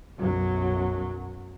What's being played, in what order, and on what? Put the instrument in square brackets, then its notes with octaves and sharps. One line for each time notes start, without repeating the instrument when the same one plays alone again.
[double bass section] B1 F#2 F#3